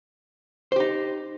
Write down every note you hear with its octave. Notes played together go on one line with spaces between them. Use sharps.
D#4 G4 C5